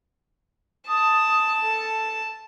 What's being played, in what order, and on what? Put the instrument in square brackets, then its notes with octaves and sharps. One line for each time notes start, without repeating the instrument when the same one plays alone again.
[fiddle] A5 [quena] D#6
[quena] A4